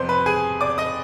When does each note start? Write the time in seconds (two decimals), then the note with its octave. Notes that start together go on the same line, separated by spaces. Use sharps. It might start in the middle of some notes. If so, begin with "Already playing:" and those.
Already playing: F2 C3 G3 B3 C5 C6
0.09 B4 B5
0.26 G#4 G#5
0.61 D5 D6
0.78 D#5 D#6